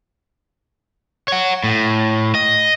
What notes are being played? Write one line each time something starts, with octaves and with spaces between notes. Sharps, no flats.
C#5 F#5
A2
D#5